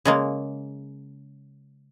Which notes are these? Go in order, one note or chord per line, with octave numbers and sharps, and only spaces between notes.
C#3 G#3 A#3